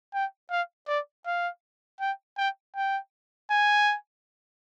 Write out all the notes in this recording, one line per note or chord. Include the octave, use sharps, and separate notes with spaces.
G5
F5
D5
F5
G5
G5
G5
G#5